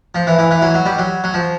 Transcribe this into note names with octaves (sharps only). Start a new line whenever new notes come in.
F3
E3
E3
E3
F#3
F#3
G3
F#3
F#3
F3